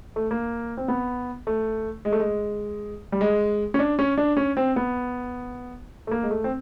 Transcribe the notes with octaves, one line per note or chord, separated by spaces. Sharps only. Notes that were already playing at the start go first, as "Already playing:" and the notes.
A3
A#3
C4
B3
A3
G#3
A3
G#3
G3
G#3
C#4
D4
C#4
D4
C#4
C4
B3
A3
A#3
G#3
A3
C4